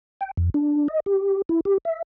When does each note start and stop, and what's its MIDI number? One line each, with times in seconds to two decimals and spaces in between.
0.21 0.31 79
0.37 0.50 41
0.54 0.88 62
0.88 1.00 75
1.06 1.42 67
1.49 1.60 64
1.65 1.78 67
1.85 2.02 76